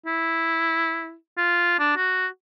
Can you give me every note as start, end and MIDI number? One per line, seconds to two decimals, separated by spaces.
0.06 1.15 64
1.38 1.78 65
1.79 1.94 62
1.97 2.27 66